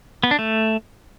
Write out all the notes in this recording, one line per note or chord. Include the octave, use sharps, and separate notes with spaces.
B3
D4
A3